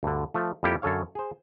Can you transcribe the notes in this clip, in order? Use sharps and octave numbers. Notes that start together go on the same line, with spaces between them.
D2 G2 D3
F3 A3
F2 G3 A#3 E4 G4 A4
F#2 D3 A4 C#5 F5
G#4 C5